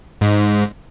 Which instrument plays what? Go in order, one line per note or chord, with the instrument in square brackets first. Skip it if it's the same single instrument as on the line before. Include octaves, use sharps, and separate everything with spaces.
[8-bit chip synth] G#2